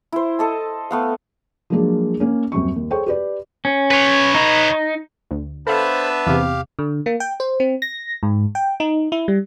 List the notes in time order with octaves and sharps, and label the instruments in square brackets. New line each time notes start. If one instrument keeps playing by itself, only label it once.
[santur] E4 C5
A4 D#5 A5
A3 B3 F5
[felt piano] F3 F#3 G#3 A#3 D4 G#4
A#3 C#4
D#1 F#2 F#3 C4 C#6
D#2
G#4 A4 C5 C#5 G5 C#6
G4 B4 D5
[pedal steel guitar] C#4
[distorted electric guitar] B4 C#5
[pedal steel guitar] D#4
[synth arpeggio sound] D2
[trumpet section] B3 D4 E5 [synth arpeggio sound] A4 F5 [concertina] C5 A5 B5
[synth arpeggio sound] E2 C3 [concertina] G4 F5
[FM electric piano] D3
A#3
G5
C5
C4
A#6
G#2
G5
D#4
E4
G3